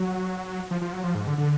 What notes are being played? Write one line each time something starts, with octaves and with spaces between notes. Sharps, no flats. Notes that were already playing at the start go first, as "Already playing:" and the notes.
Already playing: F#3
F3
F3
F#3
F3
G#2
D3
D3